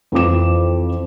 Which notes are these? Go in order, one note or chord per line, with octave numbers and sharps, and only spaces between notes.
F2 E3 F3 D6 E7